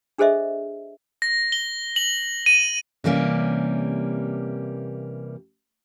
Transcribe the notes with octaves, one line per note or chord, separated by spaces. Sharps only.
D4 G#4 A4 C5 D#5 E5
A#6
G7
F#7
D#7
C3 E3 G3 A#3 C#4